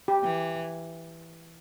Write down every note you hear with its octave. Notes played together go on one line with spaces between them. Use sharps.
G4
E3